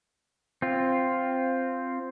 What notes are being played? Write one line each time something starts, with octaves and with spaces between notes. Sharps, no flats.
C4 F4